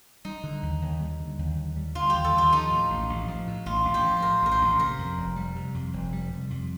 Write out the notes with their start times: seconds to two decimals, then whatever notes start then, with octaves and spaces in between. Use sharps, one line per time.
0.25 G3 D#4
0.44 D3
0.63 D#2
0.82 D#2
1.00 G3
1.20 D3
1.39 D#2
1.57 D#2
1.76 G3
1.95 D3 F4
2.10 D#2 G4
2.24 A4
2.33 D#2
2.38 F4
2.52 F3 D#4
2.72 A2
2.90 A1
3.09 A1
3.28 F3
3.47 A2
3.66 A1 F4
3.85 A1
3.94 G4
4.04 F3
4.17 C5
4.22 A2 A#4
4.42 A1 A#4
4.51 C5
4.61 A1
4.79 C3 A#4
4.98 F2
5.18 F1
5.36 G3
5.56 C3
5.74 F2
5.93 F1
6.13 G3
6.31 C3
6.50 F2